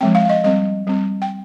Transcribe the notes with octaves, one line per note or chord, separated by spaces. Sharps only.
F3 G#3 C4 G5
F5
F5
D#5
G3 C4 D#5
G3 C4
G5